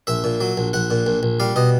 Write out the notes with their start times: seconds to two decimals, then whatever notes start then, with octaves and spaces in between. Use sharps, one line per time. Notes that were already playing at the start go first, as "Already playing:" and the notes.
0.07 A#1 E5
0.24 A#2
0.41 F#3
0.57 A#1
0.73 A#1 F#5
0.91 A#2
1.07 A#1
1.23 A#1
1.40 G3 F5
1.56 B2 D#5